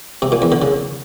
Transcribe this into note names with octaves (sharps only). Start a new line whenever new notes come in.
C3
A#2
E2
D3
C#3